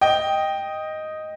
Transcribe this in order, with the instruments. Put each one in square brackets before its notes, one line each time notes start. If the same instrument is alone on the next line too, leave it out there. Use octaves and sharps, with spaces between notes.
[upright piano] D#5 G5